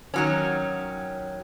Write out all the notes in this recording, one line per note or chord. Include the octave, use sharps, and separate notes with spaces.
D#3 F#3 C#4